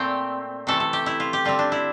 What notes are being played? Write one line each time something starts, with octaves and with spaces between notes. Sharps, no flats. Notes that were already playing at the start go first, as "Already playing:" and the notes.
Already playing: A#2 A3 C4 D5 G5
C3 E3 A3 A4
A4
G4
E4
F4
G4
D3 G3 C4 F4
D4
E4